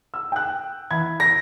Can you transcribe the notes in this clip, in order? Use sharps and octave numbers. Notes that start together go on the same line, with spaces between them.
E6
G5 F#6
E3 B5 G#6
A#6